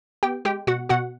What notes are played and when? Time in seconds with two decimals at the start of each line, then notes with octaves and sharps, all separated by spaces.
0.23 B3 G4 G5
0.45 G#3 G4 G5
0.67 B2 F#4 F#5
0.89 B2 F#4 F#5